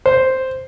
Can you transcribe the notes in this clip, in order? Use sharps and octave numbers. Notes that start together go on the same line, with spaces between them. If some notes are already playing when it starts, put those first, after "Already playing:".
C5